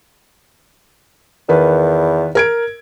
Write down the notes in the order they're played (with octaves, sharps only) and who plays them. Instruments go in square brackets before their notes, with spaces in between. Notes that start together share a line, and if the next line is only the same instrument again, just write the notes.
[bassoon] E2 [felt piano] D#3 B4
[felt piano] A#4 G#6 D7